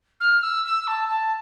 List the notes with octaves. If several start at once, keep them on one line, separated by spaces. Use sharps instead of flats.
F6
E6
E6
A5
A5